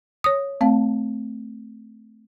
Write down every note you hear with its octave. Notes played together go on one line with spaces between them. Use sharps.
C#5 D#6
A3 C4 F5 A5